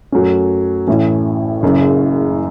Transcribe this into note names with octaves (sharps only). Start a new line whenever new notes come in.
F#2 F#3 A3 C#4
A1 A2 E3 C#4 E4
F#1 F#2 C#3